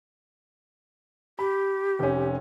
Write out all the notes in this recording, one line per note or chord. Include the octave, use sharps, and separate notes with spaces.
G4 B5
F1 C#4